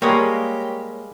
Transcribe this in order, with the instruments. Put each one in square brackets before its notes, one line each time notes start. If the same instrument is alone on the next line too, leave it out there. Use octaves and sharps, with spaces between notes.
[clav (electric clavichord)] G3 G#3 [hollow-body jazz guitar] A#3 [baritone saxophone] G4 [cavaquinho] C#5 D#6